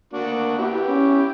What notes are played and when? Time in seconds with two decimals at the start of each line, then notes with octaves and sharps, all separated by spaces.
0.13 A#3 D4 F#4
0.58 B3 E4 G4
0.87 C#4